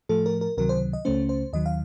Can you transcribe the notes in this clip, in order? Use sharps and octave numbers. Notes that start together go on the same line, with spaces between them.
A2 F3 A3 A4
A#4
A#4
C#2 C3 D#3 F#3 A#4
C5
D#5
C#2 C#3 A3 C#4 C5
C5
D#2 D#3 F#3 D#5
F5